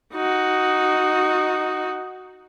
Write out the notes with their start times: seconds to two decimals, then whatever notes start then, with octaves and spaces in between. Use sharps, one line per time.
0.14 D#4 F#4